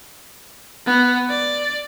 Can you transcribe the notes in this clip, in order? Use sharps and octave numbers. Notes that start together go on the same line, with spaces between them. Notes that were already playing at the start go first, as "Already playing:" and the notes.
B3
D5